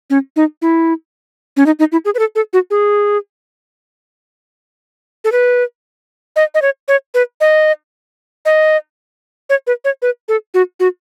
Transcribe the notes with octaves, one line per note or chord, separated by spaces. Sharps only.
C#4
D#4
E4
C#4
D#4
D#4
E4
G#4
B4
A4
A4
F#4
G#4
A4
B4
D#5
D#5
C#5
C#5
B4
D#5
D#5
C#5
B4
C#5
B4
A4
F#4
F#4